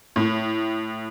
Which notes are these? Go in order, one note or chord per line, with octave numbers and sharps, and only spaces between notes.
A2